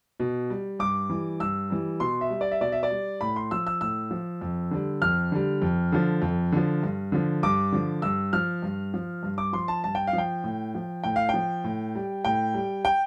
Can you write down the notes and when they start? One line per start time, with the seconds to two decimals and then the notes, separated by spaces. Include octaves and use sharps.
0.20 B2
0.50 G3
0.79 G2 D6
1.10 E3 G3
1.40 G2 E6
1.70 E3 G3
2.00 B2 C6
2.21 E5
2.30 G3
2.41 D5
2.51 E5
2.61 B2 D5
2.72 E5
2.83 D5
2.91 G3
3.21 A2 B5
3.36 C6
3.51 F3 E6
3.67 E6
3.81 A2 E6
4.11 F3
4.41 F2
4.71 D3 G3
5.02 F2 F6
5.32 D3 G3
5.62 F2
5.92 D3 F3
6.22 F2
6.52 D3 F3
6.83 G2
7.12 D3 F3
7.43 G2 D6
7.72 D3 F3
8.02 G2 E6
8.33 F3 F6
8.63 G2
8.94 F3
9.23 G2
9.38 D6
9.53 F3 C6
9.68 A5
9.84 G2 A5
9.95 G5
10.07 F5
10.13 F3
10.18 G5
10.44 A2
10.75 F3
11.03 A2 G5
11.16 F5
11.29 F3 G5
11.64 A2
11.95 G3
12.25 A2 G5
12.54 G3
12.85 G5